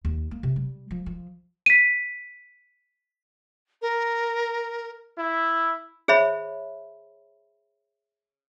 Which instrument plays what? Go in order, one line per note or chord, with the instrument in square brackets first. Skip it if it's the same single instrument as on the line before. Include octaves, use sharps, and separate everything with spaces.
[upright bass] D#2
A#3
C3
G3
F3
F3
[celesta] B6 D#7
[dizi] A#4
[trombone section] E4
[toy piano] G#4 C5 C#5 E5 B5